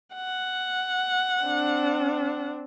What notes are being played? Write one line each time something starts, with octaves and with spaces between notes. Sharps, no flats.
F#5
C4 D4